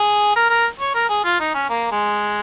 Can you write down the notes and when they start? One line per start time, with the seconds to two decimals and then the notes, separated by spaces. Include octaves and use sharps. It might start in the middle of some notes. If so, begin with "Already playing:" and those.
Already playing: G#4
0.36 A#4
0.50 A#4
0.80 C#5
0.95 A#4
1.09 G#4
1.25 F4
1.39 D#4
1.54 C#4
1.69 A#3
1.92 G#3